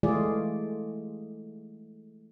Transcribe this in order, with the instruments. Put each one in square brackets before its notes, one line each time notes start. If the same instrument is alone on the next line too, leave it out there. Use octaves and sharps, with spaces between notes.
[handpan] E3 G#3 A3 F4 G#4 D5